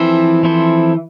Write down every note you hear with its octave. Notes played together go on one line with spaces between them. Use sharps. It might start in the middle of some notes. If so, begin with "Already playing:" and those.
Already playing: E3 F3 C4 E4 A4 C5
F3 C4 E4 A4 C5